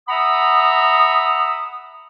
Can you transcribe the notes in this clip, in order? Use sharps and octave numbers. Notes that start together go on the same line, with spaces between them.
E5 F#5 A#5 B5 D#6